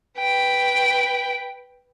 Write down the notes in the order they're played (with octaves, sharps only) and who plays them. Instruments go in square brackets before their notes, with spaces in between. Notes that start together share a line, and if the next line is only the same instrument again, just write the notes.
[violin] B4 G5